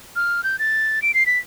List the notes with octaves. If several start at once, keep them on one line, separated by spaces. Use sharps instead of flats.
F6
G6
A6
D7
C7
B6